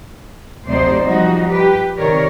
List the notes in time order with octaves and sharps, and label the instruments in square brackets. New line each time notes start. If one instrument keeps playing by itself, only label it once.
[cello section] D2 C3 F#3 D#4 C5 D5
F3 G3 D#4 F#4
G4 B4
C3 D#3 A#4 C#5 D5